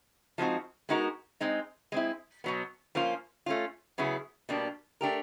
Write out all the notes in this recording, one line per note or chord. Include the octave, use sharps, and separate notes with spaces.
F3 G#3 C4 D#4 F#4
G#3 B3 D#4 F#4 A#4
G#3 C4 D#4
G#3 C4 E4
B2 F#3 B3
F3 A#3 C#4 F4
A3 C#4 F4
C#3 F#3 B3 E4 G#4
B2 G3 A#3 D4
A3 D4 G4 A#4